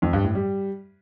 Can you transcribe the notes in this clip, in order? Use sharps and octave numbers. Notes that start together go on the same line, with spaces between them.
F2
G2
A2
G3